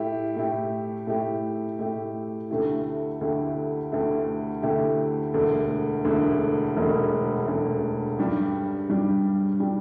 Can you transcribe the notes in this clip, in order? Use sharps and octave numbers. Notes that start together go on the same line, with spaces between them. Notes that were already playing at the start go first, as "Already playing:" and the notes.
Already playing: A2 A3 E4 G4
A2 A3 E4 G4
A2 A3 E4 G4
A2 A3 E4 G4
D2 D3 A3 E4 G4
D2 D3 A3 E4 G4
D2 D3 A3 E4 G4
D2 D3 A3 E4 G4
E1 D2 D3
E1 D2 D3
E1 D2 D3
E1 D2 D3
G2 G3 D4 G4
G2 G3 D4 G4
G3 D4 G4